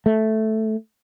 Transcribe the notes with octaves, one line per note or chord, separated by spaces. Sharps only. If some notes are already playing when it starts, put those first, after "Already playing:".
A3